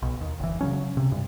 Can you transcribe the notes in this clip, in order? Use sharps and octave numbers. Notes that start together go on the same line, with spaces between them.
B1
D#2
F#1 E3
C#3 F#3 C#4
C3
G2 C3